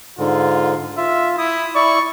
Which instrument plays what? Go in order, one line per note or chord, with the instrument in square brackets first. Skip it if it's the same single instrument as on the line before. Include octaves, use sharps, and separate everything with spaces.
[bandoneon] G#2 D3 [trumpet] F4
[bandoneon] F4 [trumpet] E5
[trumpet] E4 [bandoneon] D#6
[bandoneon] E4 D5 [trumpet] C#6